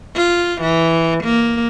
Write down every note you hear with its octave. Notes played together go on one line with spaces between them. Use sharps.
F4
E3
A#3